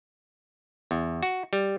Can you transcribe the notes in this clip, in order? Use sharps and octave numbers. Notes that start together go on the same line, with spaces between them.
E2
F#4
G3